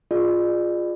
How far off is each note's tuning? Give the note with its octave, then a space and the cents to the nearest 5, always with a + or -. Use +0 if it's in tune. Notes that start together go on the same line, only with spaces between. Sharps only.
F4 +15 G#4 +0 D5 +40